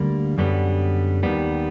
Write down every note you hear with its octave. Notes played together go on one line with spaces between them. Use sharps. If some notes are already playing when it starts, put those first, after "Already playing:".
Already playing: D2 D3 G3 A#3
F#2 D3 G3 B3
D#2 D#3 G3 B3